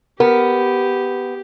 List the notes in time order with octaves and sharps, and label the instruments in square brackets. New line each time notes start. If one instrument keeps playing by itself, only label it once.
[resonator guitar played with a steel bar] B3 [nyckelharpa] G4 [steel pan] A#4